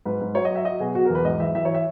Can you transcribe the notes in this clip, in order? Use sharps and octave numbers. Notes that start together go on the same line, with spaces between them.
G#2 B4
G#2
F#3 C#5
D#5
F#3
E5
F#3 D#5
B2 G#4
B2 F#4
A#4
E2
B4
G#2 D#5
E3 E5
E3 E5
C#5
E5